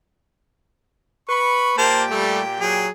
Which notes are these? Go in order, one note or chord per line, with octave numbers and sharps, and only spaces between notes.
B4 B5 C#6
A#2 A#3 G4 C5 G5 A5
G3 A3
F#3 G#4